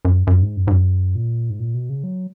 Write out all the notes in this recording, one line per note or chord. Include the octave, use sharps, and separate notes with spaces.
F#2
F#2
G#2
F#2
G#2
F#2
A#2
G#2
A#2
B2
C#3
F#3